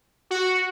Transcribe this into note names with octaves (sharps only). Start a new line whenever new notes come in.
F#4